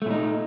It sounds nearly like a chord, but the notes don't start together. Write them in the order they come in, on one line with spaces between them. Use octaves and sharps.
A3 A#2 D#4